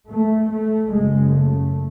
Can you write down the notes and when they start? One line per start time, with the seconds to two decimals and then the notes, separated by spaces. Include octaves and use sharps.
0.10 A3
0.51 A3
0.93 F#1 F#2 C#3 G#3
1.35 A3